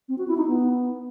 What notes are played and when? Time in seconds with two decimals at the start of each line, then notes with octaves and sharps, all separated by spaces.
0.09 C4
0.18 F#4
0.28 E4
0.37 D#4
0.47 B3